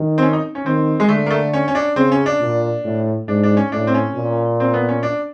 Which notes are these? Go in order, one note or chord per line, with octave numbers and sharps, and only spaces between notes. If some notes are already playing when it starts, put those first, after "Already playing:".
Already playing: D#3
C4
C#4
D#4
C#4
D#3 C4
G#3
D3 A3
A#3
A3
C#4
C#4
D4
C#3 C4
C#4
D4
A#2
A2
G#2 D4
D4
C#4
A2 D4
C4
C#4
A#2
C4
B3
C#4
D4